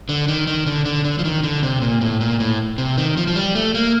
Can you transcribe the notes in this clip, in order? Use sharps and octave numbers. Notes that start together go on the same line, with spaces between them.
D3
D#3
D#3
D3
D3
D3
F3
D#3
D3
C3
A#2
A2
A#2
A2
C3
D#3
F3
F3
G3
A3
A#3